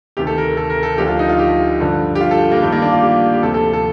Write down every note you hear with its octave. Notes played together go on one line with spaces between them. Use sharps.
D2 C3 D#3 G4
A4
A#4
A4
A#4
A4
D2 D3 F3 G4
F4
D#4
F4
G4
G2 D3 F3
G4
F4
A4
G4
A#3
G2 D#3 A3
A#3
D4
F4
G4
G4
D2 C3 F3 A4
A4
A4